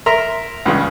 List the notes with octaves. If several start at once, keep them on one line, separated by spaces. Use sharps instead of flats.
A#4 E5 A#5 C6
C#2 G2 C#3